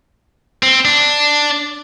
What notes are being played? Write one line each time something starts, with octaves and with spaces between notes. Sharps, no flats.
C4
D4